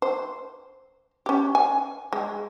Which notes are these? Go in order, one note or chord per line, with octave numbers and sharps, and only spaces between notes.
C5
C#4 G4
G#5
G#3